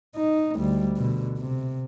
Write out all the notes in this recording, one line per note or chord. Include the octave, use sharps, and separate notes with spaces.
D#4
D2 G3
B2 D3
C3